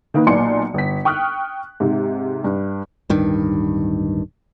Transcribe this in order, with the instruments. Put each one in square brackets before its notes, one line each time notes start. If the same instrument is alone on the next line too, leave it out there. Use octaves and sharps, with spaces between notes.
[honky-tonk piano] D#3 A#3 D#4 B4
B1 A#2 D5 G#5 C6 C#7
G1 B6
G5 C#6 D#6 F6 F#6
G#2 C3
G2
[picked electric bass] D1 G2 D#3